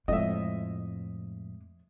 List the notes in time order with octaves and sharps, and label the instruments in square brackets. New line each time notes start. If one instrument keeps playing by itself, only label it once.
[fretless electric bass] F2 A2 [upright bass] G#3 [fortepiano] D#5 E5